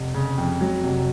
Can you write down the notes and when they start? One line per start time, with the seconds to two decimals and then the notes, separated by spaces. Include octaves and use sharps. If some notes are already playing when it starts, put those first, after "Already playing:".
Already playing: F1
0.14 C#3
0.38 F2
0.61 F#3
0.84 F1